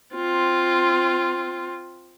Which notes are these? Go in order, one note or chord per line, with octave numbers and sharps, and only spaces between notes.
C4 F4